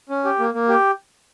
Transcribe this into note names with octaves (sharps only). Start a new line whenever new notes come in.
C#4
G4
A#3
A#3
G4